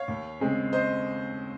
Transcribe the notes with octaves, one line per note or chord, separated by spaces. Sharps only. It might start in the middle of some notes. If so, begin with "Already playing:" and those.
Already playing: C#5 F5
D#2
C#3 G#3 C4
C5 D#5